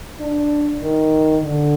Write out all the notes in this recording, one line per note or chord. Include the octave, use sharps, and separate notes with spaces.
D4
D#3
D3